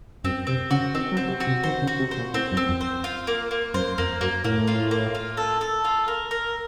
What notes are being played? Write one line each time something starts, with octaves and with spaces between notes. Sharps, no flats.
F#2 C4
C3 C4
C#3 F#4
D#3 C4
F#3
C4
C3
F#4
C3
D#3 C5
C#3
F#4
C3
C5
A#2
A2 C4
F#2
C4
F2
C5
F4
A#3
A#3
F#2 C5
F2 A#3
F#2 A#3
A2 A#3
F4
A#3
F4
A4
A4
F4
A#4
A#4